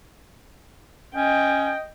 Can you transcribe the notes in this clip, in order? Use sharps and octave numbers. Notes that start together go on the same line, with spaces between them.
C#4 D#5 G5